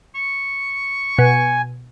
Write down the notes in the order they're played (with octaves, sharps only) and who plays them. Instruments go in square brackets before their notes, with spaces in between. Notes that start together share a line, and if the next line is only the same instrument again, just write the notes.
[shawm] C#6
[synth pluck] B2 [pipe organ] G#5